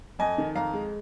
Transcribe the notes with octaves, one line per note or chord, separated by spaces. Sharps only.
F2 D#5 G#5
D#3
F2 F5 A#5
G#3